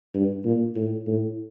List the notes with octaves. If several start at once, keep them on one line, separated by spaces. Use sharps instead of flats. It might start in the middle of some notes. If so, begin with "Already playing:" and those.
G2
A#2
A2
A2